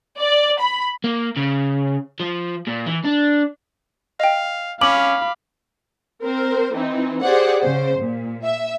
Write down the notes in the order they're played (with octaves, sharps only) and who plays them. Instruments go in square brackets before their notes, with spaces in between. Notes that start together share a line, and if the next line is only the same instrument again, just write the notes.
[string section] D5
B5
[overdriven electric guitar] A#3
C#3
F3
A#2
E3
D4
[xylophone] D#5 G5 [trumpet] F5
[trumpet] C#4 [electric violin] F5 B5 [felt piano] D6 [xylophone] F#7
[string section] C4 A#4 C5
E3 C4 D#4
G4 G#4 C5 D5 F#5
C#3 C5
A#2
E5